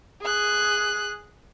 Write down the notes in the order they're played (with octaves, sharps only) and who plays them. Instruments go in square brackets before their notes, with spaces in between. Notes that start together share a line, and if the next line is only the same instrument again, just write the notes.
[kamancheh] G#4 F#6